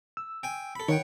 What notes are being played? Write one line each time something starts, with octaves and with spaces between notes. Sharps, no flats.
E6
G5 G#5
A4 B5
D#3 C#5 F#5 G5